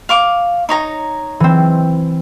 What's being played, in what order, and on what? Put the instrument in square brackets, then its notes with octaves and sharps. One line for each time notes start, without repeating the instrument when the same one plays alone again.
[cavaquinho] F5 C#6 D6
D#4 C#5 A#5
[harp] E3 C4